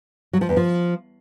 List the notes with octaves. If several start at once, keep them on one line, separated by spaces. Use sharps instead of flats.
F#3
F3
E2
F3